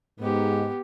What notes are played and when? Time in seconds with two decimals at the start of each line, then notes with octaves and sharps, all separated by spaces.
0.20 G#2 B3 G4